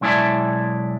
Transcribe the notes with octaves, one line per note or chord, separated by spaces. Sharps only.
B1 G#3 E4 D5 E5 A5